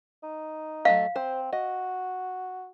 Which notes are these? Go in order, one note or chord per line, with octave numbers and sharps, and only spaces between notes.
D#4
F#3 A3 D#5 F5
C4 C5
F#4 D#5